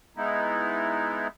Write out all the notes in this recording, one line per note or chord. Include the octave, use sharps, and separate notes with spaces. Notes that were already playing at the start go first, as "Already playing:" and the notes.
G#3 B3 D#4 E4